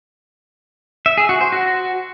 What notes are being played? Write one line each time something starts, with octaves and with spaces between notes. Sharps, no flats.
E5
G#4
F#4
C5
F#4